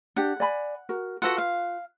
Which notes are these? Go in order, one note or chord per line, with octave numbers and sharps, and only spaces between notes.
D4 G4 F#5 G5
D5 G#5 B5
F#4 A#4
F4 F#4 A4 B4 F#5
F5